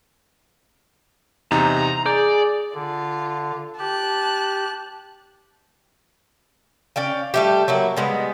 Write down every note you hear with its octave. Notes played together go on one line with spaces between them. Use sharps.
E2 C3 D#4 A#5
G#4 D5 G6
D3 F4
G4 A5 F#6
C#4 D5 F5 G5
G3 A3 G4
F#3 A#3 E4
G3 G#3 B3